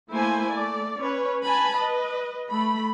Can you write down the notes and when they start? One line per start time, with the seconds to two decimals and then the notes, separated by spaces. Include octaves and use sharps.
0.11 A3 A#3 E4 C5 G#5
0.47 A3 D5
0.99 C#4 B4 C#5
1.42 B4 G#5 A5 B5
1.78 B4 D#5
2.51 A3 B5